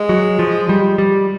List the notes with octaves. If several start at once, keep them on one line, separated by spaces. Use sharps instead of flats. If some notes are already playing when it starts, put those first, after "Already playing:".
Already playing: G#3
F#3
F3
G3
G3